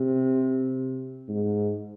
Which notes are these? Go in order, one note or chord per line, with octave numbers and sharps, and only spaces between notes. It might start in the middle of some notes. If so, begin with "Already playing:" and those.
Already playing: C3
G#2